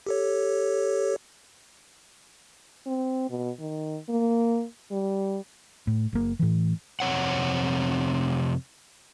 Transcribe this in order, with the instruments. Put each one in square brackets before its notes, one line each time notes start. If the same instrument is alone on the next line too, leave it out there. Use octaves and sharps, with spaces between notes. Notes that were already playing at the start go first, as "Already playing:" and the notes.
[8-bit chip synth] G4 A4 C#5
[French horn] C4
B2
D#3
A#3
G3
[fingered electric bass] A2
F#1 A#3
A2 E3
[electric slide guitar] F2 C3 C#5 F#5